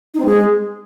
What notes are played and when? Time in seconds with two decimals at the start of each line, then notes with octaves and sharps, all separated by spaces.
0.14 D#4
0.20 C4
0.25 G#3